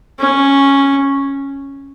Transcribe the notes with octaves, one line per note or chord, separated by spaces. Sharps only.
C#4